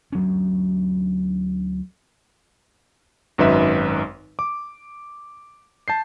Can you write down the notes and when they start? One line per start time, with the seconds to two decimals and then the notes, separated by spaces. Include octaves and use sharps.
0.12 D2 F#3 C#4
3.38 G#1 F#2 D#4 B4 E5
4.39 D6
5.88 A5 G6 C7